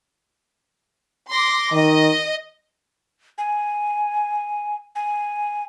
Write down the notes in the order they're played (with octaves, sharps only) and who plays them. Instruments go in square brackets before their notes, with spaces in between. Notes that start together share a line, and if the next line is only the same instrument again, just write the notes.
[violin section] C6 D6 A#6
[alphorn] D#3 [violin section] D#5
[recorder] G#5
G#5